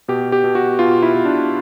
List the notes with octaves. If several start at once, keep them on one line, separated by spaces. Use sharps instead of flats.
B2 G4
G4
B2
F#4
B2 F4
E4
B2
D4